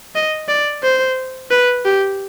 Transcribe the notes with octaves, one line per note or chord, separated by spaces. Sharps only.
D#5
D5
C5
B4
G4